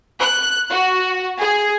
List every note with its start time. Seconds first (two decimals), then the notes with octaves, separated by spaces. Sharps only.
0.19 F#6
0.71 F#4
1.40 G#4